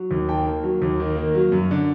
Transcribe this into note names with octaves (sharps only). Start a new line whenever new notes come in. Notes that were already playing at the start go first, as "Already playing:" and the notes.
Already playing: F#3
D#2
D#3 G5 A5
A#3
F#3
D#2
D#3
A#3
F#3
F#2
D3